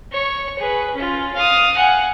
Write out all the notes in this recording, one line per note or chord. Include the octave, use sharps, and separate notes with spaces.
C#5 C#6
G#4 B4
C#4 F4
F5 D#6
F#5 G#5